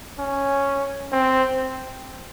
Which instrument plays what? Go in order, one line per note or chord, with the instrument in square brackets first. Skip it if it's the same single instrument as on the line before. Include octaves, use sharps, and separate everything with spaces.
[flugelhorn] C#4
C4